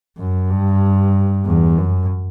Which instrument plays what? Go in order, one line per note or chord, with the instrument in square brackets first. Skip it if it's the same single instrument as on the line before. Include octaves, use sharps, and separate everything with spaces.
[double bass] F#2
G2
E2
F#2